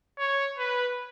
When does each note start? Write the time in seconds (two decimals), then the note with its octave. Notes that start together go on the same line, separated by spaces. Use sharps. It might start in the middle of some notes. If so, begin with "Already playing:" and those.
0.18 C#5
0.59 B4